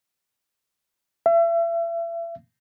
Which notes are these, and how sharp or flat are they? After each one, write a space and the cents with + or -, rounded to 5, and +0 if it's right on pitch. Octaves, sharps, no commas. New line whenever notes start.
E5 +35